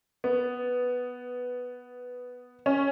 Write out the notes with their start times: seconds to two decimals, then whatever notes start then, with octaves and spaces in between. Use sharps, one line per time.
0.24 B3
2.66 C#4